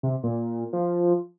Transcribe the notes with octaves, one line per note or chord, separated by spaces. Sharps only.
C3
A#2
F3